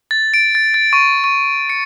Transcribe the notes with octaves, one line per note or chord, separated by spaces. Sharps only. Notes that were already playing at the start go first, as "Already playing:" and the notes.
A6
D7
A6
A6
C#6
C#6
C#7